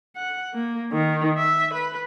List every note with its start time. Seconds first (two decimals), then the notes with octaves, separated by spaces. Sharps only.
0.16 F#5
0.54 A#3
0.92 D#3
1.38 E5
1.74 B4